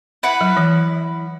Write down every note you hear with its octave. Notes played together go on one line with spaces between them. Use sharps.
E4 B4 F#5
F#3
E3